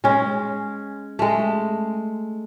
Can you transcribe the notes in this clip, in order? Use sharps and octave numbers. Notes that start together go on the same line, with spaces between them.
G#3 C#4
G#3 A3